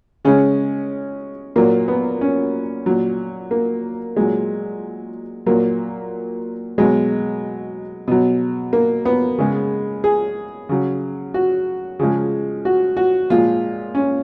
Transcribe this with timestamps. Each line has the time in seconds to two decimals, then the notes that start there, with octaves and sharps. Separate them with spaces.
0.25 C#3 G#3 C#4
1.56 A#2 F#3 A#3
1.88 B3
2.21 C#4
2.86 A#2 F#3
3.51 A#3
4.16 A#2 F#3 G#3
5.46 A#2 F#3 A#3
6.78 B2 F#3 G#3
8.08 B2 F#3
8.73 A#3
9.05 B3
9.38 C#3 G#3
10.04 G#4
10.69 C#3 F#3
11.34 F#4
11.99 C#3 F3 G#3
12.65 F#4
12.97 F#4
13.30 A#2 F3 G#3 F4
13.95 C#4